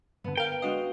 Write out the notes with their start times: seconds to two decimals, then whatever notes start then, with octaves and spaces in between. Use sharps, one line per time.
0.24 G2 D3 B3
0.37 A#4 F5 G5
0.62 G#3 D4 F#4 D#5 F5